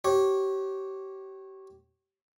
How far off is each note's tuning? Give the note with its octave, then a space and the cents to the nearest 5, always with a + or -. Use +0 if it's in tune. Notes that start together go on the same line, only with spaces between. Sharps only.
G4 -30 C#5 -25